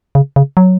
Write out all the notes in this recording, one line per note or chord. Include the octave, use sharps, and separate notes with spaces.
C#3
C#3
F#3